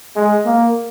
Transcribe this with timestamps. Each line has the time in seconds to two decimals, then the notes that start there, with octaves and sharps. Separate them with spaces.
0.16 G#3
0.46 A#3